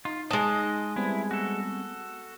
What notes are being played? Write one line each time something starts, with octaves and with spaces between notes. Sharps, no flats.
D#4 F4
G#3 D#5 A5
G3 B3 C4 E4
F#4 A4